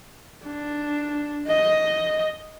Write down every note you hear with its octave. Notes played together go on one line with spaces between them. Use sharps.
D4
D#5